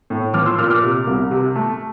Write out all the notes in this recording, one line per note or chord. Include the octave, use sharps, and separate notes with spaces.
A2
F3 D6 F6
C6 E6
A#2 D6 F6
D6 F6
C3
C2
C3
A3